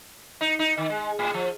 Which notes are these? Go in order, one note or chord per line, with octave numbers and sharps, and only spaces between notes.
D#4
D#4
D#3
G#3
A2
F3